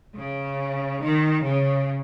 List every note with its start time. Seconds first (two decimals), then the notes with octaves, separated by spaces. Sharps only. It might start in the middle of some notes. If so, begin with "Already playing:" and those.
0.16 C#3
1.02 D#3
1.44 C#3